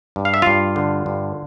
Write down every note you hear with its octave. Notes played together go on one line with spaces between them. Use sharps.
G2
F5
E5
G2 F4 F5
D3
G2